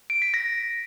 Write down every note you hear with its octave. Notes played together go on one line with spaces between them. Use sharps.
D7
B6
A#6